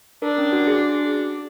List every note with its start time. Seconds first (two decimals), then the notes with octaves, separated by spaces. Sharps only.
0.22 D4 A#4
0.38 C#4
0.52 F#4
0.67 G#4